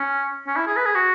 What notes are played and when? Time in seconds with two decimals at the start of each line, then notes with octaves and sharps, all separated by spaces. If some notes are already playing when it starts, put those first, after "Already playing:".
Already playing: C#4
0.47 C#4
0.56 E4
0.67 G#4
0.76 B4
0.86 G#4
0.95 F#4